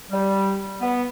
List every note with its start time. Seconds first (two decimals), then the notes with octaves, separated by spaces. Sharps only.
0.11 G3
0.81 B3